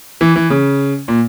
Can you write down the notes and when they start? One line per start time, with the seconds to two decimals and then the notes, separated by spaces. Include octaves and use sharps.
0.21 E3
0.36 E3
0.50 C#3
1.08 A#2